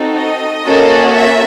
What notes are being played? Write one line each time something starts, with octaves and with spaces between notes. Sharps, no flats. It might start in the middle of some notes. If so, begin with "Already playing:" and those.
Already playing: C4 D#4 F#4 A4
D#5
A#3 C#4 F#4 A4
E5